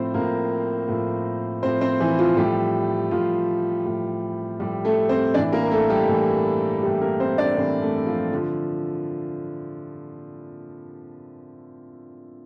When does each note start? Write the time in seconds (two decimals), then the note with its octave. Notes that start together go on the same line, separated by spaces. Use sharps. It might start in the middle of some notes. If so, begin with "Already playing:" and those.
Already playing: A2 F3 C4 C5
0.14 A2 F3 A#3 A#4
0.88 A2 F3
1.63 A2 F3 C4 C5
1.81 C4 C5
2.00 E3 E4
2.19 F3 F4
2.37 A2 F3 G3 G4
3.11 A2 F3 F4
3.86 A2 F3
4.60 A2 F3 G3 G4
4.85 A3 A4
5.09 C4 C5
5.34 E3 D4 D5
5.39 A2
5.53 A#3 A#4
5.63 A#4
5.71 A3 A4
5.90 G3 G4
6.08 A2 E3
6.83 A2 E3 G3 G4
7.01 A#3 A#4
7.20 C4 C5
7.38 D4 D5
7.57 A2 E3 C4 C5
7.82 A3 A4
8.06 F3 F4
8.33 D3 F3